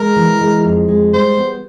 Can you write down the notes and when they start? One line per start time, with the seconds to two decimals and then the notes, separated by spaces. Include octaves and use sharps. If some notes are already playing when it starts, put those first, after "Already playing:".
Already playing: G#3 A#4
0.16 E3
0.41 G#3
0.65 F2
0.88 G#3
1.13 G3 C5
1.37 B3